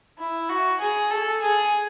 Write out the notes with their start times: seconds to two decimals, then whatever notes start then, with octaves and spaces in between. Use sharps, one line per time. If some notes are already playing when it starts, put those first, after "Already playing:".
0.19 E4
0.49 F#4
0.81 G#4
1.11 A4
1.42 G#4